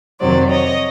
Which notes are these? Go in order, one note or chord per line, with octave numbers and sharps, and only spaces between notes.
F2 C3 D#3 F#3 C5 D5
C#5 D#5